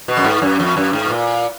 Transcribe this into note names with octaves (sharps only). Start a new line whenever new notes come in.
B2
F#2
G#2
F#2
F2
F#2
G#2
B2
A#2